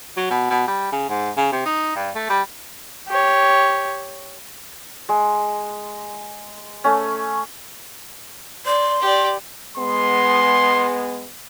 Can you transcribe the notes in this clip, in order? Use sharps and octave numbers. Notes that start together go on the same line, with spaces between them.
F#3
B2
B2
G3
C#3
G#2
C#3
C3
D#4
G2
A3
G3
G4 C#5
G#3
A3 C#4
D5 C6
G4 D5
G#3 B3 C6